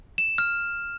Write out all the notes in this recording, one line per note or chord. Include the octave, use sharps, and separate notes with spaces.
E7
F6